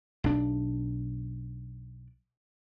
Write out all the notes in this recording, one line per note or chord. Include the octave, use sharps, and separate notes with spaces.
B1 D4